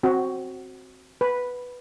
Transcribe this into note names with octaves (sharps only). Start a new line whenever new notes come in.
C4 F#4
B4